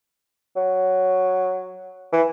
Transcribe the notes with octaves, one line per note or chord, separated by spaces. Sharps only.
F#3
E3